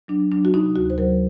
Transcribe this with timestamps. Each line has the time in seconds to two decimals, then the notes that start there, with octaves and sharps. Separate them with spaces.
0.08 F#3 D4
0.31 F#3 D4
0.45 F#4
0.53 C3 D#4
0.76 D2 F#4
0.90 C5
0.98 F#3 A#4